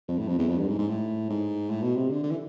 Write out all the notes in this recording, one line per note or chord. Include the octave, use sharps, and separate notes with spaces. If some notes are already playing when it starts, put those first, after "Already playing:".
F2
A2
F2
E2
F2
G2
G#2
G#2
A2
G#2
A2
B2
C3
D3
D3
E3